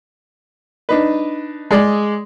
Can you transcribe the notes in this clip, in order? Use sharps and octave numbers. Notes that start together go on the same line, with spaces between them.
D4 D#4 B4
G#3 G#4 D5